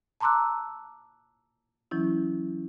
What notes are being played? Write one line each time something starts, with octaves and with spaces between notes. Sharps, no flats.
A5 A#5 C6 D6 E6 F#6
E3 F#3 C#4 E4